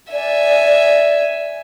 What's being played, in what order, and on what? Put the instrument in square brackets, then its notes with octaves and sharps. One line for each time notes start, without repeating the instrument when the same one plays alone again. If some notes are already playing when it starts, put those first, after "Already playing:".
[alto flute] D5 [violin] E5 G#5